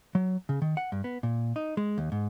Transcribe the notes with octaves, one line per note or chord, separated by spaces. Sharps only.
F#3
C#3
D#3
F#5
G2
B3
A#2
D#4
G#3
D#2
G#2